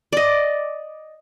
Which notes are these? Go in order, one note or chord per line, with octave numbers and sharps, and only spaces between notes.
D5 D#5